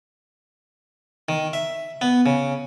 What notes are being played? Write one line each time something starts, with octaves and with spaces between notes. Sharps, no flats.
D#3
E5
B3
C#3